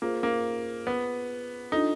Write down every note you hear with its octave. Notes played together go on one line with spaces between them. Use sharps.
A#3 F4 G#4 C5
A#3
B3
D4 D#4 F4 A4